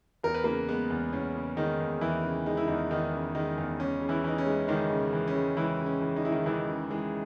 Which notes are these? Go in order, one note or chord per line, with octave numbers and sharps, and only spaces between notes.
E2 A#4
B4
C#3 A#3 A#4
G#3 B3
E2
E2 C#4
C#3
D#3 G#3 D#4
E2
E2 E3 E4
C#3
G#3 D#4
E4
E2 D#3 D#4
E2 D#3 D#4
C#3
D#3 G#3 D#4
E2
C#2 C#4
C#3
E3 E4
E3 D#4
C#4
G#3
C#2 D#3 D#4
C#3
E3
C#4
G#3
C#2 E3 E4
C#3
C#4
E3
D#4
G#3 E4
D#3 D#4
C#2 E3 E4
C#3
E3 G#3 G#4